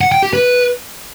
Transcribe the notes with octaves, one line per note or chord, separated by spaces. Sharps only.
F#5
G5
G4
B4